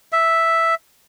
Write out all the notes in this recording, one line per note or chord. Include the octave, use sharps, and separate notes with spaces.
E5